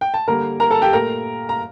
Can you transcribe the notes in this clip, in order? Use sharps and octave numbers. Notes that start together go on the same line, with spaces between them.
G5
A5
D3 G3 A#3 A#4 A#5
A#4 A#5
A4 A5
G4 G5
A#2 A3 A#4 A#5
A#5